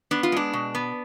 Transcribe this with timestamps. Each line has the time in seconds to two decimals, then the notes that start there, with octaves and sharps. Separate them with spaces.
0.11 B3 D4
0.23 F4
0.32 G#3 D4
0.53 B2
0.75 B3